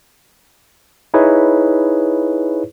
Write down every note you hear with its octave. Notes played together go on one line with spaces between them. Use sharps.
D#4 E4 G#4 B4 C#5